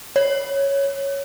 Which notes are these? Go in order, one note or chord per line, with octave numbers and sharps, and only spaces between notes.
C#5